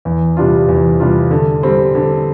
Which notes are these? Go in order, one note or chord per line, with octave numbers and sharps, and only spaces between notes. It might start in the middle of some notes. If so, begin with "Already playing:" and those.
E2
C3 G3 D4 F4
E2
C3 G3 D4 F4
D3
G3 C4
D3